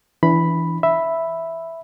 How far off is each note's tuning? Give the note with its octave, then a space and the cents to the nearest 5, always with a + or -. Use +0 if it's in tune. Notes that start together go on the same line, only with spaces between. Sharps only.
E3 +0 D4 -35 B5 +0
E5 +0 B5 +0